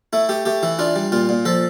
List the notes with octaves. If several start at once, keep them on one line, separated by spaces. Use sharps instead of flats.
A3 E4
A3 G4
A3 G4
E3 E4
D4 F4
G3
A#2 F4
A#2
F3 A4